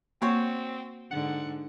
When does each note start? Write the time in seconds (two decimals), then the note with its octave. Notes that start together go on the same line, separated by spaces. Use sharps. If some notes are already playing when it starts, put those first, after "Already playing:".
0.22 A#3 C4 F#4 C5 C#5
1.11 G#2 D3 F#5